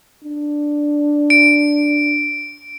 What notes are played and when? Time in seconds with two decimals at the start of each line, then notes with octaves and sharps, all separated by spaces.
0.24 D4
1.30 D7